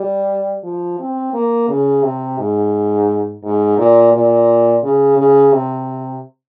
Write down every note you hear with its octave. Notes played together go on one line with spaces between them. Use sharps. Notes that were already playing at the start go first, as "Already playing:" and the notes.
Already playing: G3
F3
C4
A#3
C#3
C3
G#2
G#2
A#2
A#2
C#3
C#3
C3